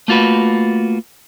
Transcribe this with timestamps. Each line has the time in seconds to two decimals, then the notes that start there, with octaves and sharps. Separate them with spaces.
0.08 A3 A#3 F4 F#4 B4